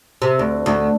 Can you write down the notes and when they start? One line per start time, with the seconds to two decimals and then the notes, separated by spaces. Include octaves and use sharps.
0.22 C3
0.39 D2
0.66 D2